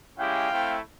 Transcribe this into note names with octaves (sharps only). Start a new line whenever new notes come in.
G#3 C#4 E4 G4 F5 G5
A3 C4 E4